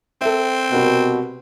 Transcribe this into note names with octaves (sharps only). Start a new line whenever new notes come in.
C4 A4 E5
C2 B2 A#4 F#5